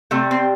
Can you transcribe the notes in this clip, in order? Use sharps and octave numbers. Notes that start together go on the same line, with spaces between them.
C3 G3 A3
C4